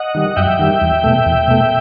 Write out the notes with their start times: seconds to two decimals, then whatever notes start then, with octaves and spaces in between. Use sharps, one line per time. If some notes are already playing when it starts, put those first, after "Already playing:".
Already playing: D#5 F#5
0.15 D#3 G3
0.36 F#2 E5 G5
0.59 D#3 G3
0.81 E2
1.04 B2 A3
1.26 E2
1.48 B2 A3